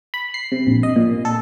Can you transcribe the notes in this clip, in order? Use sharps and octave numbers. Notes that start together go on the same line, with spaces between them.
B5
C7
C3
A#1
D#5
A#2
A4